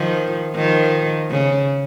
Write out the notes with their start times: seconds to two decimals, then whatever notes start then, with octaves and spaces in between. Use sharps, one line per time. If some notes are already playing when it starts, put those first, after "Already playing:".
Already playing: D#3 F3
0.54 D#3 F3
1.30 C#3